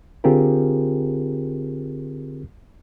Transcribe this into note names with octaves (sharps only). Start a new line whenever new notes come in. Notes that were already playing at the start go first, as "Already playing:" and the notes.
D3 C4 F4 G4 G#4 A#4